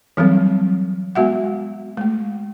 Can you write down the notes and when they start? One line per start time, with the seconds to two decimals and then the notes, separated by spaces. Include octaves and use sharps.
0.17 E3 F#3 G3 C4
1.15 G#3 B3 F#4 E5 F#5
1.97 G#3 A3